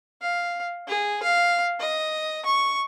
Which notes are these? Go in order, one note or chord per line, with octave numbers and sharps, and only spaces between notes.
F5
G#4
F5
D#5
C#6